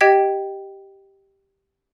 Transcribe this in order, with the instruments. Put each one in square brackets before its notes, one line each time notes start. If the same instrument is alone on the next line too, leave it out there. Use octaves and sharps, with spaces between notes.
[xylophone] G4 D#5 G5 G#6 B6